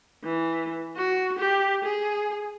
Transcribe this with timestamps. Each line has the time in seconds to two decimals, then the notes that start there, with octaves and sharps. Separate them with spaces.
0.24 E3
0.97 F#4
1.39 G4
1.84 G#4